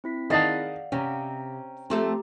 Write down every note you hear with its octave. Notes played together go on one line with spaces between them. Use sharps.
C4 E4 B6
D#3 G#4 D5 D#5 F5 F#5 A5
C3 C#4 G5 A#5
F3 A3 C4 G4 A4 A#5